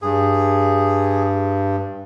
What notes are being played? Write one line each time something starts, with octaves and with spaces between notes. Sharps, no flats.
G2 G#4